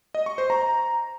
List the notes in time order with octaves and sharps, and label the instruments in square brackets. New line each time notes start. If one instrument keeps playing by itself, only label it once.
[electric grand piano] D#5
C#6
C5
A#5